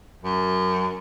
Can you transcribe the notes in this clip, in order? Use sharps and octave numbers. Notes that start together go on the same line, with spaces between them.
F#2